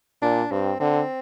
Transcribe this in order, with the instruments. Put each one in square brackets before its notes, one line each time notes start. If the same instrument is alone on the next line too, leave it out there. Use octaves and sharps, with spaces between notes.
[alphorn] A#2 [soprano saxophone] D4
[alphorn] G2 [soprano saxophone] C4
[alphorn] D3 [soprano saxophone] C4